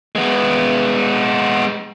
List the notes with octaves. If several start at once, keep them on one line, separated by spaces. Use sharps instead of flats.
G#3 B3